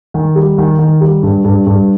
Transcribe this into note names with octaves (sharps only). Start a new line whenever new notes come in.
D#3
G3
D#3
D#3
G3
G2
G2
G2